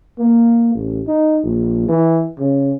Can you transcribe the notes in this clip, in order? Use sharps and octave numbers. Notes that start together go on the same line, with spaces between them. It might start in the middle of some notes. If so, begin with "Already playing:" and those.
A#3
A1
D#4
A#1
E3
C#3